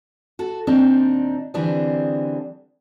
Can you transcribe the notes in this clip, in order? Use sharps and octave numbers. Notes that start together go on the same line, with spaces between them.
F#4 A4
D#2 A#2 C4 D4 D#4
D3 E3 G3 C4 D4 G#4